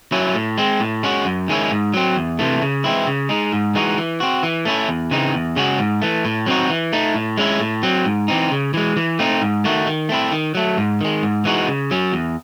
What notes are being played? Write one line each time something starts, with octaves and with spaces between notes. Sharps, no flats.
F#3 C#4 E4
A2
G#3 C4
A2
G#3 C#4 F#4
F#2
D#3 G#3 C#4 E4
G#2
F#3 C4
E2
C3 E3 A3
C#3
E3 G#3 C4 E4
C#3
G#3 D#4
G#2
E3 G#3 D#4 F#4
E3
C4 F#4
E3
A3 C#4 E4
E2
C#3 E3 C4 D#4
E2
C#3 G#3 C#4 F#4
G#2
E3 A3
A2
F#3 C4 D#4 F#4
E3
A3 D#4
A2
G#3 C#4 E4
A2
F#3 C4
G#2
E3 C4 D#4
C#3
E3 G#3
E3
A3 C4 D#4
G#2
D#3 A3 D#4 F#4
D#3
A3 C4 E4
D#3
F#3 A3
G#2
D#3 G#3
G#2
E3 G#3 D#4 F#4
C#3
F#3 C#4
E2